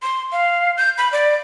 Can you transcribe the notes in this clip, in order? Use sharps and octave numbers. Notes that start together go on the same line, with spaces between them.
C6
F5
G6
B5
D5